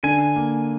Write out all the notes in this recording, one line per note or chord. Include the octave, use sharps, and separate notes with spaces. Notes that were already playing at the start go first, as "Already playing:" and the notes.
D3 G#5
A#3